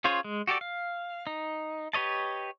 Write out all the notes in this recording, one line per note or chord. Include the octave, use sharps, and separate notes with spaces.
C#4 F4 G#4 C5 C#5
G#3
F#4 G4 A4 D5
F5
D#4
G4 B4 C#5 D#5 A5